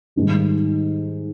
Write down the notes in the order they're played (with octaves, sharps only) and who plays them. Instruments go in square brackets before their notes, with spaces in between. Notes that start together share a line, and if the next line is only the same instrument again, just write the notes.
[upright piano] G#2 D#3 G3